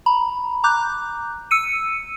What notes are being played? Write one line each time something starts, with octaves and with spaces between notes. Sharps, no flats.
A#5 B5
A#5 D6 F#6 G6
E6 C#7 D#7